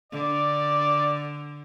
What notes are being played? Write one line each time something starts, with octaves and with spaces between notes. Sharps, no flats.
D3 D5